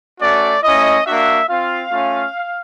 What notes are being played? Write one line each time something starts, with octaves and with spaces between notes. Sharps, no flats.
A3 C#4 F#4 D5
A3 C#4 E4 D#5
A#3 D4 F#4 E5
C4 F4 F5
A3 C#4 F4